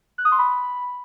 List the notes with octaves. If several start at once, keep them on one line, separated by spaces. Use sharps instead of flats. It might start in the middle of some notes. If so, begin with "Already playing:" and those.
F#6
D#6
C6
B5